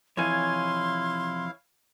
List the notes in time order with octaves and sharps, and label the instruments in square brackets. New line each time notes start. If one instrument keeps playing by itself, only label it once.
[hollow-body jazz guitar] F2 C3 E3 [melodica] E4 F5 [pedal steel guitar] C#5 G#5 [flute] C6